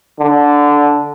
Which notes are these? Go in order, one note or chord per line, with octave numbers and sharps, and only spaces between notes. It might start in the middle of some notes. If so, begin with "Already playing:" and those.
D3